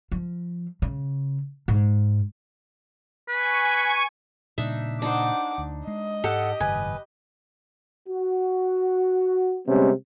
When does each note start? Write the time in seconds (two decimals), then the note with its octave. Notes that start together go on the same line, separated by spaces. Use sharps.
0.12 F3
0.82 C#3
1.68 G#2
3.29 B4 G#5 C#6
4.58 A#2 C#3 G3 D4 D#4 E5
5.02 D4 D#4 C5 F#5 D6
5.58 D2
5.87 G#3 D#5
6.24 G#2 G4 A4 F#5
6.60 F#1 G#2 D#3 B4 G#5
8.08 F#4
9.67 C3 G3 G#3 B3 C#4